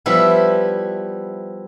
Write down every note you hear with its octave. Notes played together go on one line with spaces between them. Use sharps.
F3 G3 B3 E4 B4